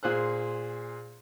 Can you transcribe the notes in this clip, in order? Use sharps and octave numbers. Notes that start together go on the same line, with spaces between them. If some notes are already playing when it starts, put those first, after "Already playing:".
A#2 G#4 C5 F#6